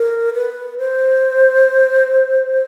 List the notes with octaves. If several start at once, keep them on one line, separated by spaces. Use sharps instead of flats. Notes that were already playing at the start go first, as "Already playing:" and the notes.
Already playing: A#4
B4
C5